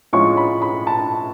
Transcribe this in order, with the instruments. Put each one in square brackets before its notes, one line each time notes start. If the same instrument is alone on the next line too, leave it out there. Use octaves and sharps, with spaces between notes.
[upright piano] A2 F3 G#3 C#4 F4 C#6
B5
B5
A5